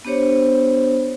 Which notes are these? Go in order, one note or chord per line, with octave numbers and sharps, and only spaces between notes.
B3 D4 G4 C5 C#5